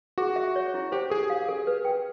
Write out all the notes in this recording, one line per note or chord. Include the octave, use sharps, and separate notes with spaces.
F#4 G#4
E5
C#5
E4
G4 C5
G#4 A4
F5
A4
B4
G5